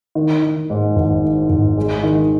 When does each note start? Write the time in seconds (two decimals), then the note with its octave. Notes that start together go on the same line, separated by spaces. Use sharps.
0.15 D#3
0.43 D#3
0.70 G#2
0.96 G#1
1.24 D#3
1.50 G#1
1.77 G#3
2.03 D#3